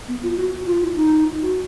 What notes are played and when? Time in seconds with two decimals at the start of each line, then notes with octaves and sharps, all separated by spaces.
0.08 B3
0.23 F4
0.37 F#4
0.67 F4
0.82 E4
0.95 D#4
1.42 F#4